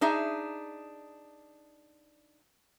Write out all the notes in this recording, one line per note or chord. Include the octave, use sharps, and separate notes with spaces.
D4 D#4 G#4 E5